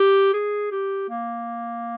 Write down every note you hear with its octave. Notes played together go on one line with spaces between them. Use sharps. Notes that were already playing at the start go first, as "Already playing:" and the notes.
Already playing: G4
G#4
G4
A#3